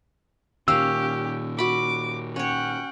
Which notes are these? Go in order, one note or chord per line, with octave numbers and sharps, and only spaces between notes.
A#2 D#3 C#4 G4 F5 E6
F#4 B5 D6
C#4 C#5 F#5 G5